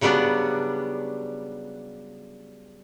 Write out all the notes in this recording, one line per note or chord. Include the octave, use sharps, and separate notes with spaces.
C#3 F#3 G3 B3 D4